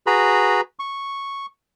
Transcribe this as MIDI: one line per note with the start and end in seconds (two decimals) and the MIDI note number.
0.07 0.61 66
0.07 0.61 68
0.07 0.61 71
0.07 0.61 82
0.07 0.61 83
0.79 1.46 85